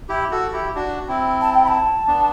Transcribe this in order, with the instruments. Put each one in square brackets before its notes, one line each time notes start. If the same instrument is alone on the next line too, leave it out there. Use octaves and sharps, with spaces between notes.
[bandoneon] E4 G4
F#4 A4
E4 G4
D4 F#4
C4 E4
[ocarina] A5
G5
B5
A5
[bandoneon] B3 D4